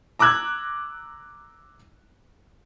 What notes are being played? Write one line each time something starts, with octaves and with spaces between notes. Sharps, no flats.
A#5 D6 E6 F#6 G#6